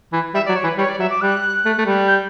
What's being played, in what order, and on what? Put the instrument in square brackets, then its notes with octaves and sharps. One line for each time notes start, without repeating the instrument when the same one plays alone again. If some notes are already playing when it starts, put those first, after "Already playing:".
[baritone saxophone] E3
[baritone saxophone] G3 [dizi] E5
[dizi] D5
[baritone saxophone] F#3
[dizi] C#5
[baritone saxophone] E3
[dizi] B4
[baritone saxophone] G3 [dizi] C#5
[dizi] D5
[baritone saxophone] F#3 [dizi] E5
[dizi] D6
[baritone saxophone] G3 [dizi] F#6
[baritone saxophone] A3
A3
G3
[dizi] G6